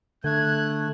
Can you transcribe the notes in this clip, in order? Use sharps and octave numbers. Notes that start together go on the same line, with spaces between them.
D3 A3 F#6 G#6